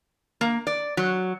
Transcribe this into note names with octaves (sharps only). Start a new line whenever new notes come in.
A#3
D5
F#3